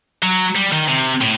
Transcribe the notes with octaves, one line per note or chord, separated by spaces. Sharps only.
F#3
G3
D#3
C3
A2